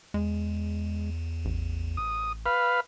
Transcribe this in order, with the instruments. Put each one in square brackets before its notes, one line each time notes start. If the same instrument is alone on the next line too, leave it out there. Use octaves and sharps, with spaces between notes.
[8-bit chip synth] E2 [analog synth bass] G#3
[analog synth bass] A1
[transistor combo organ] D#6
B4 F5